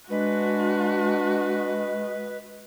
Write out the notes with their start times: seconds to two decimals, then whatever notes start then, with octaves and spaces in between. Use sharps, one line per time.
0.10 G#3 D4 F#4 B4